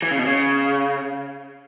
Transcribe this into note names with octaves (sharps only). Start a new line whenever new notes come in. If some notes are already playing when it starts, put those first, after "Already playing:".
E3
C#3
B2
C#3